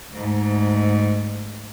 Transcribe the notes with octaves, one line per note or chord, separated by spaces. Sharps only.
D2 G#2